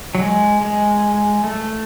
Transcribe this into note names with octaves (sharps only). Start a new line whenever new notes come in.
F#3
G#3
G#3
A3